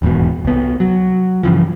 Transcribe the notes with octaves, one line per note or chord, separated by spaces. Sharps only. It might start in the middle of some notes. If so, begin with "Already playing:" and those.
D#1 E2 G#2 B2
C2 B3
F#3
G2 C#3 E3 F3